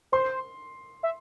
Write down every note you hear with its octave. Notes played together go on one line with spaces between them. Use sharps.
C5 C6
E5